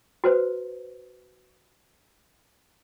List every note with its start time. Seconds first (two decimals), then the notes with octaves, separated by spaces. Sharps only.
0.24 F#4 B4 C5